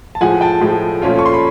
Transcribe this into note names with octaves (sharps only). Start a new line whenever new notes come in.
A5
A2 F3 G#3 F#5 G#5
G5 A5
A2 F3 G#3
A#2 F3 A3 C#4 F4
C#6
C6
B5